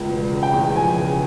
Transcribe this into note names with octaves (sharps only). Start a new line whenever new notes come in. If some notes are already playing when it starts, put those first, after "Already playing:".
Already playing: C#2
E1
C#3
G5
E2
F3 G#5
C#3